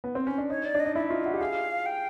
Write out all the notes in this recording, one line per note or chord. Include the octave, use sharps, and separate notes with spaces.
B3
C4
C#4
D4
D#4 C#5
D5
D4
D#5
D#4
E4 E5
F4
F#4
G4 F#5
G#4 F5
G5